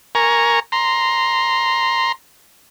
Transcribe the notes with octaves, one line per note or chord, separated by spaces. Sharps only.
A#4 G#5 A#5 C#6
A#5 C6